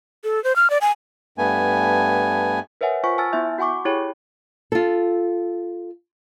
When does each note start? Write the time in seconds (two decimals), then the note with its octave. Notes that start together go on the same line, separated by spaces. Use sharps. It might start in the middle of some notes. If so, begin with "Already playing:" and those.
0.24 A4
0.44 C5
0.56 F6
0.70 D5
0.81 G#5
1.38 G2 A3 B3 G#5
2.81 A#4 B4 C#5 E5 F#5 G#5
3.04 F4 C5 F#5 G#5 C#6 B6
3.18 G#5 A5 E6 F6 A6
3.32 B3 E4 E5 G6
3.58 F#4 F#5 G#5 C#6 D6
3.85 E4 G4 G#4 C#5 G5 B5
4.72 F4 A4